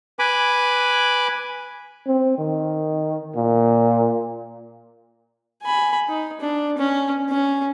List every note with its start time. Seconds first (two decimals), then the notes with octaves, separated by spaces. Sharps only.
0.19 B4 G#5 B5 D6
2.07 C4
2.38 D#3
3.36 A#2
5.63 G#5 B5
6.08 D#4
6.40 D4
6.78 C#4
7.29 C#4